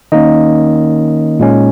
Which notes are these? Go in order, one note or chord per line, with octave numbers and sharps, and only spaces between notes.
D#3 A#3 C#4 D#4 D#5
A#2 G#3 C#4